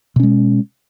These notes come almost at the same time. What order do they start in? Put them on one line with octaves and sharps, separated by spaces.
B2 C#4 G#3